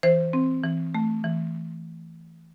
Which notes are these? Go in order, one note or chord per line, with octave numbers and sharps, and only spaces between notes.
E3 C5
C4
E3
A3
E3